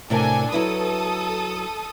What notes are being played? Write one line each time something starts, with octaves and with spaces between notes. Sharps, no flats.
A2 C3 D4 A4 A#4 G#5
F#3 E4 A4 B4 D#6